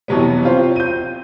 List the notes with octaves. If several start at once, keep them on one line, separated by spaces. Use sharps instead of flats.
F2 C3 E3 F#3 G3 B3
C4 F4 C5
G6 D#7